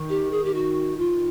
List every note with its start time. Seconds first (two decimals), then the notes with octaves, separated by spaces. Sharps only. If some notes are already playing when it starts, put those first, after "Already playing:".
Already playing: D#3
0.09 G4
0.31 G#4
0.44 G4
0.54 F#4
0.97 F4